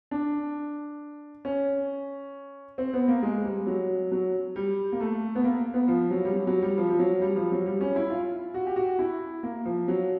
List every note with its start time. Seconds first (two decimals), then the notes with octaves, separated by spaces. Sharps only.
0.11 D4
1.45 C#4
2.78 C4
2.93 B3
3.08 A#3
3.23 G#3
3.45 G3
3.67 F#3
4.12 F#3
4.56 G3
4.92 A#3
5.00 A3
5.35 B3
5.44 A#3
5.74 B3
5.88 F3
6.11 F#3
6.25 G3
6.33 F#3
6.47 F#3
6.63 G3
6.78 F3
6.90 F3
6.99 F#3
7.22 G3
7.36 F3
7.52 F#3
7.66 G3
7.81 C#4
7.96 E4
8.10 F4
8.54 F#4
8.67 G4
8.76 F#4
8.99 E4
9.43 A#3
9.65 F3
9.88 F#3